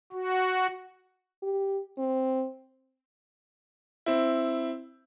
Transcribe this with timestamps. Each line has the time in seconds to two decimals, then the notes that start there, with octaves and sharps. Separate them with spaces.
0.12 F#4
1.43 G4
1.98 C4
4.06 C4 E4